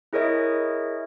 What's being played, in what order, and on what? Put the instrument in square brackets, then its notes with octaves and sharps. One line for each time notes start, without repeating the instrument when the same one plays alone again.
[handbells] E4 G#4 A#4 C#5 D#5 E5